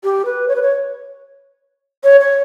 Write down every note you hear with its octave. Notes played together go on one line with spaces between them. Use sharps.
G4
B4
C#5
B4
C#5
C#5
C#5